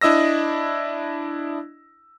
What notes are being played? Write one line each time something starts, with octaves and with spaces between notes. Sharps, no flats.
D4 E4 D#5 E6 A#6